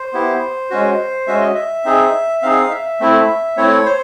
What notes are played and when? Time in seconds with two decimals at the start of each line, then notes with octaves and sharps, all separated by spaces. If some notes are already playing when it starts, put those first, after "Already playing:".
Already playing: C5
0.13 B3 E4 G4
0.70 G#3 C#4 F#4
1.27 G#3 C#4 F#4 E5
1.40 D#5
1.54 E5
1.85 C4 D#4 G#4
2.42 C4 D#4 G#4 F5
2.71 E5
3.00 A3 C4 E4
3.57 A3 C4 E4 C#5
3.86 C5